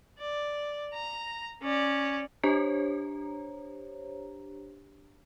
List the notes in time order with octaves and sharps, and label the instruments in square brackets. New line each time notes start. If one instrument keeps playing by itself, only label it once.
[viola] D5
A#5
C#4 D5
[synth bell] D4 G4 C5 C#5 A#5